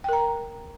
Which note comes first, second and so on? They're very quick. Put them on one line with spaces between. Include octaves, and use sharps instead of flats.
G5 A#4 A#5